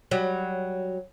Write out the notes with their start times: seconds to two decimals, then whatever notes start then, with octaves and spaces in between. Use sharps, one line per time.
0.11 F#3 G3